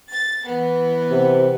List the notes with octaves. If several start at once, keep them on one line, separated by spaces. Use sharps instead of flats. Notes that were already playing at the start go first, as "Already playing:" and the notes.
A6
E3 B3
C3